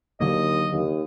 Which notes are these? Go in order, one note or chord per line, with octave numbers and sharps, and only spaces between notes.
D#2 D3 F#3 A#3 D#5
D#2